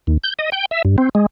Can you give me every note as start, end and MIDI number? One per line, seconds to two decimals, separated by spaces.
0.07 0.17 39
0.24 0.34 91
0.39 0.50 75
0.52 0.66 79
0.71 0.82 76
0.85 0.96 43
0.98 1.09 60
1.15 1.26 56